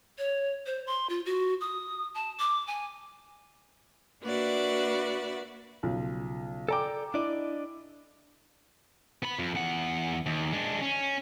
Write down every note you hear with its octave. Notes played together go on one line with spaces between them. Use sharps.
C#5
C5
C6
F4
F#4
D#6
A5
D6
G#5
A#3 D4 F#4 B4 D5 E5
B1 C#3 F3
A4 D5 G5 G#5 A#5 D6
D4 E4 D5 D#5
B3 B5
F2
E2 F#5
D#2
G#3 D4
C#4